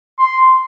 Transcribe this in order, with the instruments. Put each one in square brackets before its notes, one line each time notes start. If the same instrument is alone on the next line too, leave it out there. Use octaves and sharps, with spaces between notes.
[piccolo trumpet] C6